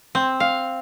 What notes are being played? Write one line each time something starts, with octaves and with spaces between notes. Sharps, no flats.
C4
F5